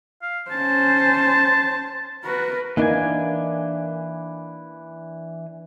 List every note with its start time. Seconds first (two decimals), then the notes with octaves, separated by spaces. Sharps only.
0.22 F5
0.51 C#4 C5 A5
2.25 F#4 A#4 B4
2.77 E3 A#3 D4 D#4 G#5